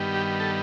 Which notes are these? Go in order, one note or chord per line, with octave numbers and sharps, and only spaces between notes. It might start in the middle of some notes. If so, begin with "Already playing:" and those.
Already playing: G2 D#3 G3 B3
G4
A4